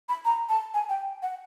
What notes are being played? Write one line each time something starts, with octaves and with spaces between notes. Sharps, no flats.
B5
A#5
A5
G#5
G5
F#5